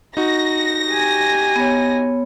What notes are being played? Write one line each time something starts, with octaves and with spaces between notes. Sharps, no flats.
D#4 F#4 A#6
G4 G#5
B3 C#5